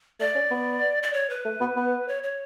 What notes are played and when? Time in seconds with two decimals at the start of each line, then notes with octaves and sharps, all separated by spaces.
0.20 A3 D5
0.35 C#4
0.51 B3
1.03 D5
1.13 C#5
1.30 B4
1.45 A3
1.61 B3
1.76 B3
2.08 C#5
2.23 C#5